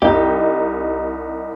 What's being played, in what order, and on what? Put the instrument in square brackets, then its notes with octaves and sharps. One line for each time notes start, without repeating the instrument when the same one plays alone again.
[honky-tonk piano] C2 D#4 [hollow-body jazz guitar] G4